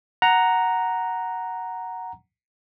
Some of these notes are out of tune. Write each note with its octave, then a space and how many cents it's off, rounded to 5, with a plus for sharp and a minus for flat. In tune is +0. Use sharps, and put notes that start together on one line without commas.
F#5 +0 A#5 +0